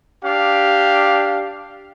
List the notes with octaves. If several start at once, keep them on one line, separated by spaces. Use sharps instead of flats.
D4 G4 F5